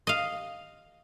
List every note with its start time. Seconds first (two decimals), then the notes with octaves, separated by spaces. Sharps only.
0.07 D#5 F5